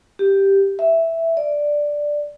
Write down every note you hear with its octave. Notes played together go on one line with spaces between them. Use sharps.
G4
E5
D5